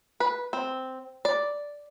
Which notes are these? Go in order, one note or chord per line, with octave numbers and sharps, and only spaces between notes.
B4
C4
D5